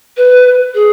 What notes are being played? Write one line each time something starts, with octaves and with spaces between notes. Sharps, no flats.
B4
G#4